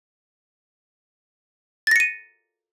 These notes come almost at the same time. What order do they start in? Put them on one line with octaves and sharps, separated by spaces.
A6 A#6 C#7 D#7